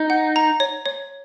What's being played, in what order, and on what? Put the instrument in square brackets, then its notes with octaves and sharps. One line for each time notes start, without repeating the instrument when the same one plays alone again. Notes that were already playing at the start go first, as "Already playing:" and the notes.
Already playing: [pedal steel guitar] D#4
[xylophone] F#5
A#5
C#5
C#5